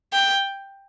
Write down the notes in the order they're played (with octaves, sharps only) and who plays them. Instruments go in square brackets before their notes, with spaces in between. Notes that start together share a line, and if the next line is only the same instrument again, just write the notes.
[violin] G5